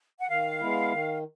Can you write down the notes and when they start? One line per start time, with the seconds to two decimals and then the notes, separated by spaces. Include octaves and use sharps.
0.19 F#5
0.29 D#3 F5
0.61 G#3 B3 E4
0.92 D#3